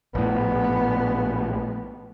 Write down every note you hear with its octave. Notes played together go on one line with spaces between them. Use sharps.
A#1 A2 B3